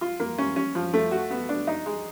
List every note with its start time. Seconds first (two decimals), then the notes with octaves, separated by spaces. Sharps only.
0.01 F4
0.20 A#3
0.38 C#4
0.56 C#4
0.75 F3
0.93 A3
1.12 F#4
1.30 B3
1.49 D4
1.67 D#4
1.86 G#3